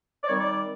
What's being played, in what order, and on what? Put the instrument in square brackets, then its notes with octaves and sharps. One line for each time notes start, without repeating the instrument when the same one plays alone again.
[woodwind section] D5
D#3 G3 C4 D#4 C#5
D5
D5